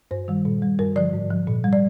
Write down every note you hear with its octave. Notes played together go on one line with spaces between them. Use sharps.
G2 C5
D#3 G3
A#2
G3
G2 A#4
D3 F3 D5
G#2
F3
A#2
G3
D5